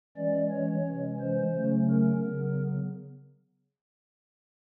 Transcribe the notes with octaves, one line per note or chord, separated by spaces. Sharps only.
E3 G#3 C#4 D5
C#5
C3 E3 G#3 C#4
C5
C#3 F#3 A3 C#4
A#4
C#3 F#3 B3